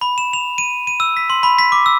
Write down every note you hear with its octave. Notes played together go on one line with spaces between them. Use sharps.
B5
E7
F7
D#7
D#7
E6
B6
C6
B5
B6
D6
E6